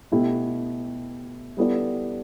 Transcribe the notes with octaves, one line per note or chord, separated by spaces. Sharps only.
B2 A3 E4 G4
G3 B3 E4 A4 D5